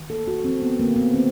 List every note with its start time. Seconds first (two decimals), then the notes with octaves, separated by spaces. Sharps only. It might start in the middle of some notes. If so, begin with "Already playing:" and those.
Already playing: D#3
0.10 A#3 A4
0.28 F#4
0.44 F3 C4
0.62 B3
0.79 D3 A#3
0.96 B3
1.13 D#3 C4